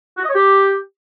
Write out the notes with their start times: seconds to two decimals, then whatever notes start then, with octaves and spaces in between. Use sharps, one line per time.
0.17 F#4
0.23 D#5
0.29 C#5
0.34 G4